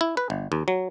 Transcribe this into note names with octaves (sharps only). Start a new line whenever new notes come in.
E4
B4
G1
D#2
F#3